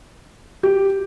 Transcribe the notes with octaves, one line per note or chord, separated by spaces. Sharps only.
G4